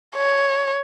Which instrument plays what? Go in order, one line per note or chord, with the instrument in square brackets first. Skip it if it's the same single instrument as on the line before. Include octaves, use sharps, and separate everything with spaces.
[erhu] C#5